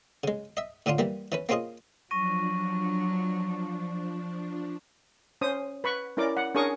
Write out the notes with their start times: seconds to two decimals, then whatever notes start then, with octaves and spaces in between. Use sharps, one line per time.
0.24 C#3 G#3
0.57 D#5 E5
0.86 A2 D3 C#4 D4 F4
0.98 E3 G3 A#3
1.32 E3 C#4 B4
1.49 A#3 C4 C#4 F4 G#4 D#5
2.11 F3 F#3 D4 C#6 A#6 D#7
5.41 C#4 C5 D#6
5.84 B4 B5 C#6
6.17 C#4 E4 A#4 D5 D6
6.37 F#5
6.55 C#4 D4 G#4 A#4 C#6 D#6